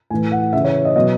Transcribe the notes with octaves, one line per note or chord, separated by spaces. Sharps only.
A2 E3 G#5
F#5
C#3 E3 E5
C#5
D#5
B2 F#3 D#5